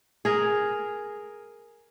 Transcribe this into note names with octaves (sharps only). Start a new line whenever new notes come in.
G#4 A#4